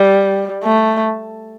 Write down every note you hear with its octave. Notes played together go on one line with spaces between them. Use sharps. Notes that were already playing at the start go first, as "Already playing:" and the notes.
Already playing: G3
A3